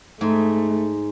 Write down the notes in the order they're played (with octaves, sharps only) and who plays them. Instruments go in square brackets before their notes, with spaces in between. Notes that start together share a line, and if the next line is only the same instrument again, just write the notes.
[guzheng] G#2 [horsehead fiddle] A3